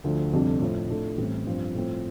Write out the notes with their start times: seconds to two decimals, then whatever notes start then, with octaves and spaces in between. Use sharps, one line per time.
0.04 D2 D3 F3
0.33 G1 F2 C3 G3 D4
0.61 A2 F3 C4
0.89 A2 A3 D4 F4
1.18 A1 A2 G3 C4
1.46 G2 F3 C4 F4
1.75 A2 F3 C4 F4